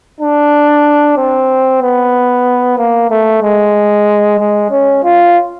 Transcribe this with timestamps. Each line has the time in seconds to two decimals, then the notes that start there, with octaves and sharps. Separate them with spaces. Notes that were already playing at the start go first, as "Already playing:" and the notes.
0.21 D4
1.17 C4
1.82 B3
2.78 A#3
3.10 A3
3.42 G#3
4.40 G#3
4.71 C#4
5.04 F4